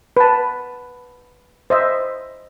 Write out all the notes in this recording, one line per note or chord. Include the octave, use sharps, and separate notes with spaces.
B4 A5
C5 D#5 E5